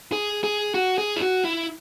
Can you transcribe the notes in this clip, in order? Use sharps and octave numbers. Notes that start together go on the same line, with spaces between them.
G#4
G#4
F#4
G#4
E4
F#4
E4